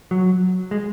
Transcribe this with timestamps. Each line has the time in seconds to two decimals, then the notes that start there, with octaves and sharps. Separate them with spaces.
0.11 F#3
0.71 G#3